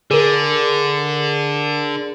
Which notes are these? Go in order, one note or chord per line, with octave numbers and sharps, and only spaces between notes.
D3 G#4 A#4